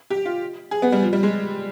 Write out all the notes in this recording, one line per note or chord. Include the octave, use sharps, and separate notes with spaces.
G4
F4
G#4
B3
G3
F3
G3
G#3